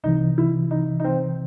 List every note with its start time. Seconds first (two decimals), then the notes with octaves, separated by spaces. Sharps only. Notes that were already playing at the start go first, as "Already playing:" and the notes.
0.04 C2 C3 E3 D#4
0.38 E4
0.71 D#4
1.00 D#4
1.04 C4